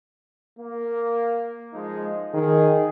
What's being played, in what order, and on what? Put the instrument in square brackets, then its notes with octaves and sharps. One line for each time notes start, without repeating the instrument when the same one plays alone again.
[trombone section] A#3
F3 G#3 D#4
[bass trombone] D#3 [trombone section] G#4